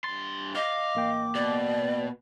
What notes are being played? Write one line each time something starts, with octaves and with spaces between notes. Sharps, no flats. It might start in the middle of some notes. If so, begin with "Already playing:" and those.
G2 C6 A6
D#5 F5 D6
A1 A#3 G5
B2 D5